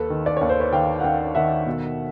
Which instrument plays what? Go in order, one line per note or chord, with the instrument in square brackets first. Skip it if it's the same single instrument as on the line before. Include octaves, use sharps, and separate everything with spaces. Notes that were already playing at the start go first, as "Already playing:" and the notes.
Already playing: [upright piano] D#2 A4 B4
D#3
D5
D#2 C#5
C5
B4 C#5
D#3 F5 G5
F#5
D#3 F5 G5
D#3 E5 F#5
B2